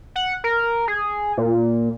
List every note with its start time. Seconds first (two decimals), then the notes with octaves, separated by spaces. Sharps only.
0.16 F#5
0.44 A#4
0.88 G#4
1.37 A#2